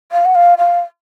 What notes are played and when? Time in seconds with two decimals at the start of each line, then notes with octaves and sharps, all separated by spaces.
0.12 F5
0.25 F#5
0.35 F5
0.58 F5